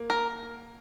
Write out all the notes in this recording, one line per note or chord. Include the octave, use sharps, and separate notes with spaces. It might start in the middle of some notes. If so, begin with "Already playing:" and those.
Already playing: A#3
A#4